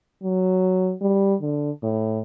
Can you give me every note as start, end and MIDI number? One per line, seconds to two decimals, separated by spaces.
0.23 0.93 54
1.01 1.35 55
1.41 1.71 50
1.83 2.21 45